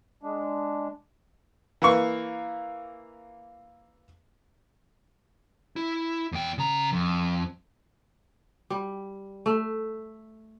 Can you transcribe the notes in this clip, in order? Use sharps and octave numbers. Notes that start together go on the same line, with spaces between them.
G#3 D4
E3 A#3 C#6
E4
E2 G5
C#3 A#5
F2
G3
A3